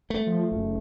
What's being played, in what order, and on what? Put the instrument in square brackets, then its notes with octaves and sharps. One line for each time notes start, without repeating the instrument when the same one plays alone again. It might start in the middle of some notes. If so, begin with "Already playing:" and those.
[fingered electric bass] A3
[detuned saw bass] F3
F#1